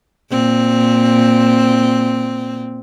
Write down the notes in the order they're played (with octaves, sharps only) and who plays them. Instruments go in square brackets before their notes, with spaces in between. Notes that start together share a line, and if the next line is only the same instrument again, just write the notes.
[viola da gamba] A#2 C4